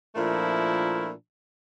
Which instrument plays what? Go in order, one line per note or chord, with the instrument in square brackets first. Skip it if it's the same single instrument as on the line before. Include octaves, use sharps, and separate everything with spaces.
[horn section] A#2 F3 A3 D4 E4 A#4